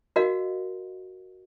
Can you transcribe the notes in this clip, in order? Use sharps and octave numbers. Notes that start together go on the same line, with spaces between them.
F#4 A#4 D#5 F5